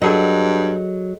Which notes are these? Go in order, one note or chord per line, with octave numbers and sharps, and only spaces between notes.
G2 F#3 G#4 A4 D#5